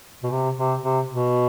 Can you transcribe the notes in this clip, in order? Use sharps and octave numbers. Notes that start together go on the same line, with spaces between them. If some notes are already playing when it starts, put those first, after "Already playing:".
B2
C3
C3
C3
B2